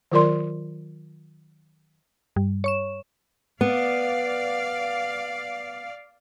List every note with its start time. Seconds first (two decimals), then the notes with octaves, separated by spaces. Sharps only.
0.11 D#3 F#3 F4 A#4 D5 C6
2.36 G2 G3
2.64 C#5 C#6 E7
3.61 B3 D5 F5